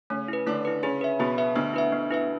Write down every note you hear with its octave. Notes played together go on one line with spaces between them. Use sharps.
C#3 A3 C#4
E4 B4
D3 A3 D4
E4 B4
C#3 C#4 G#4
B4 E5
B2 B3 G#4
B4 E5
D2 D3 B3
E4 B4 E5
B3
E4 B4 E5